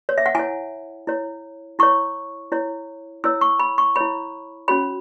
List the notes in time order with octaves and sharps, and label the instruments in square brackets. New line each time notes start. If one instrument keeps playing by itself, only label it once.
[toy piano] C#5
E5
F#5
E4 C#5 G#5
E4 C#5
E4 C#5 C#6
E4 C#5
E4 C#5 E6
C#6
B5
C#6
E4 C#5 B5
C#4 F#4 C#5 B5